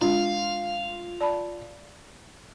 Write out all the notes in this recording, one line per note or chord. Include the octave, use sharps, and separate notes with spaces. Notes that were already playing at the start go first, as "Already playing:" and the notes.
G#3 D4 F4 F5
D5 A5 B5